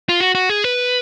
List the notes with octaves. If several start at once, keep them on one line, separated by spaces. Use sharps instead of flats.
F4
F#4
F#4
G#4
B4